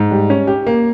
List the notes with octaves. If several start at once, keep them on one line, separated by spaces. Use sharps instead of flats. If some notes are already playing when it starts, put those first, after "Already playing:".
Already playing: G#2
G3
C#4
G4
A#3